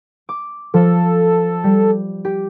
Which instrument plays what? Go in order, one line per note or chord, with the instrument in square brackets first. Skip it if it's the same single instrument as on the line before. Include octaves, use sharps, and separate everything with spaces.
[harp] D6
[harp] F3 [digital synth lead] A4
[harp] G3
G4